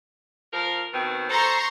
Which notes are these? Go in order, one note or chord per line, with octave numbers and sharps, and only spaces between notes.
F3 A#4
B2 D#3 C4
A4 C5 A#5 C6 C#6